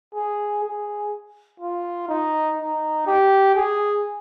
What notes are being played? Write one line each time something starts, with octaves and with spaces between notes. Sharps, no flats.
G#4
G#4
F4
D#4
D#4
G4
G#4